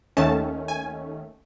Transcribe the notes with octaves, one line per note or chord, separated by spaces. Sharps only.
D#2 D#3 A3 C#4 A5
G#5